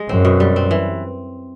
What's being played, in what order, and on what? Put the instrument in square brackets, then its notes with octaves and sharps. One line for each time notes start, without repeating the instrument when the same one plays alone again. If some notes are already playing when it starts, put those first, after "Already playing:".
Already playing: [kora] G#3
[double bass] F#2 [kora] C4
[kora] B2
G3
C4
E3